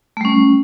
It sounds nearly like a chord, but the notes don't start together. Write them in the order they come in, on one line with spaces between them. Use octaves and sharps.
A3 G3 C#4